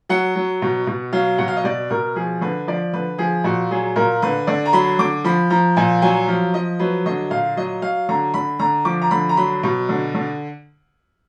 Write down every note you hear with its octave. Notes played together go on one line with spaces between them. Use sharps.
F#3 F#5
F#3
B2
B2
F#3 F5
B2 F#5
F5
D#5
B2 D5
B2 A#4
F3 G#4
D3 B4
F3 D5
D3 B4
F3 G#4
A#2 F#4
F#3 G#4
A#2 A#4
D3 B4
D3 D5
A#5
F#3 B5
D3 D6
F3 B5
F3 A#5
A#2 G#5
F#3 G#5
F3 F5
F3 D#5
F#3 B4
D3 D#5
A#2 F5
F#3 D#5
F#3 F5
D3 A#5
D3 B5
D3 A#5
F3 D6
A#5
D3 B5
A#5
F#3 B5
B2
D3
D3